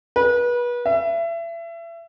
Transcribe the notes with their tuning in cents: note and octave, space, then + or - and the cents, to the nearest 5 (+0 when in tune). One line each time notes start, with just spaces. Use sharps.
B4 -30
E5 +30